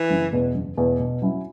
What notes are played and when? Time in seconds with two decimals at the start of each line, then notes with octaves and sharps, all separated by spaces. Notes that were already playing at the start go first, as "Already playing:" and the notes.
Already playing: E3
0.10 F#1
0.33 E2 B2
0.55 F#1
0.77 E2 B2
1.00 B2
1.22 F#3 C#4 E4